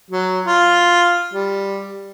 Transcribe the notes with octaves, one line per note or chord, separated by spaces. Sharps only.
F#3
F4
G3